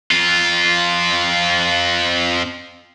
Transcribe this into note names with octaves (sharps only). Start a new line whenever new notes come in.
F2 F4